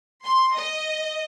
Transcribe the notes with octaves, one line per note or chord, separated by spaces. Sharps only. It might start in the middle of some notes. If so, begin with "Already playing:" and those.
C6
D#5